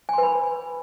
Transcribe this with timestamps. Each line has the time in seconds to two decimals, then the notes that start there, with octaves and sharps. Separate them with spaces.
0.09 G#5
0.13 C6
0.18 B4
0.23 B5